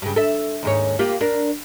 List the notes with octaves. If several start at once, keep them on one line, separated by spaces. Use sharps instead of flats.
G2 C#3
A4 E5
D#2 G#2 C#5
A#3 F4 G4
D4 A#4